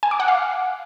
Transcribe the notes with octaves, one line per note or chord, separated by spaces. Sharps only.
G#5
D6
F#5
F5